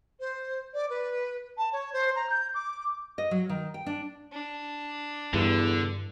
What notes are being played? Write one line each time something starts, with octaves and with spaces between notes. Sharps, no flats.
C5
D5
B4
A5
C#5
C5
A#5
G6
D6
D#5
F#3
D#3
G5
D4
D4
E2 G2 D3